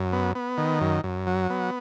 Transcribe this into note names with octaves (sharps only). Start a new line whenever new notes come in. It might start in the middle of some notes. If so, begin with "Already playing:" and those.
Already playing: F#2
B3
B3
D#3
F#2
F#2
F#3
B3